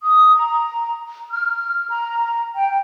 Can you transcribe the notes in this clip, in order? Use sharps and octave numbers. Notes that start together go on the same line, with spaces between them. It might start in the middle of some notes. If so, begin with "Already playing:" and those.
D#6
A#5
F6
A#5
G5